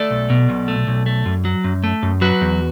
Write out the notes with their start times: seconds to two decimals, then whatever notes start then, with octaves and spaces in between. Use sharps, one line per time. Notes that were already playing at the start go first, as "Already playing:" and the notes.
Already playing: A3 A4 D5
0.10 B1
0.30 B2
0.49 B1
0.68 A3
0.87 B1
1.06 A3
1.26 F#2
1.45 F#3
1.64 F#2
1.84 A3
2.03 F#2
2.21 F#3 F#4 B4
2.41 E2